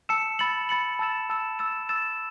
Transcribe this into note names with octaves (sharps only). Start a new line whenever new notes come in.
A5 E6 C#7 E7
B5 A6 C#7 F#7
B5 A6 C#7 F#7
A5 E6 A6 E7
A5 E6 A6 E7
E6 A6 E7
E6 A6 E7